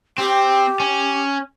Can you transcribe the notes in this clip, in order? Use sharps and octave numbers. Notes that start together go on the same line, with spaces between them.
C4 G4
C#4